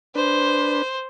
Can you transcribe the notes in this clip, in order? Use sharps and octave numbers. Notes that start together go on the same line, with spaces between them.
D4 B4 C5